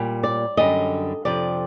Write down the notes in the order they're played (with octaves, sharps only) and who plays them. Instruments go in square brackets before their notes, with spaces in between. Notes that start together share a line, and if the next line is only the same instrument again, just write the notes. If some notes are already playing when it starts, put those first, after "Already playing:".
Already playing: [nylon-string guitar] A#2 G3
D5
F#2 D3 G3 D#5
F2 C3 F3 D5